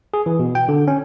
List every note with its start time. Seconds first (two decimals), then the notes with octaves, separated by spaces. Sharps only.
0.14 G#4
0.26 E3
0.40 B2
0.55 G5
0.68 D3
0.88 C#4